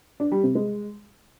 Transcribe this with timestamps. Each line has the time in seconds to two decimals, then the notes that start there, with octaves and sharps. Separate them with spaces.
0.20 D4
0.32 G3
0.43 C3
0.55 G#3